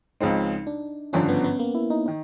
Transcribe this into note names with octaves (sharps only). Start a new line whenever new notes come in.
C#2 C#3 F3 G#3 C4 D#4
D4
G#1 G2 D3 F3 C#4
B3
B3
A#3
E4
D#4
D#3 D#4